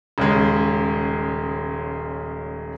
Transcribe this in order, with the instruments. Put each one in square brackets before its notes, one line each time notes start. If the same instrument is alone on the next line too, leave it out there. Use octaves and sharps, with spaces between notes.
[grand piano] D#1 C#3 G#3